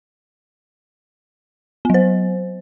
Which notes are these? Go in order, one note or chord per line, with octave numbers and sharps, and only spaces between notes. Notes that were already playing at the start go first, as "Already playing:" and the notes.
F#3 B3 C5